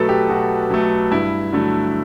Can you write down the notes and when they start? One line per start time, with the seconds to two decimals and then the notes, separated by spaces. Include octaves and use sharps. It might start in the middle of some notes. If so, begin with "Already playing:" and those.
Already playing: B2 F#3 A3 A4 B4
0.09 G4
0.29 B2 F#4
0.70 F#3 A3
1.11 G2 E4
1.53 D3 F#3 A3